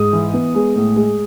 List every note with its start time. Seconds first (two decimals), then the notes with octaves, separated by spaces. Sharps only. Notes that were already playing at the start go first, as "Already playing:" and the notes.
Already playing: G#2 D#6
0.13 E3
0.34 B3
0.55 G#3
0.76 A2
0.96 G#3